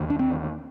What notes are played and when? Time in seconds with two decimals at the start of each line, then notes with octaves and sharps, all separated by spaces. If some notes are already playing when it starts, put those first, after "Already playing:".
Already playing: D#2 D3
0.10 D4
0.19 C4